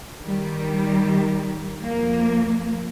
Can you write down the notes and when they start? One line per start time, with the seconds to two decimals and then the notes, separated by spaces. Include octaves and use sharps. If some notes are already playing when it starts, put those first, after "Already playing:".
0.23 D#3 G3 G4
1.85 F2 F3 A#3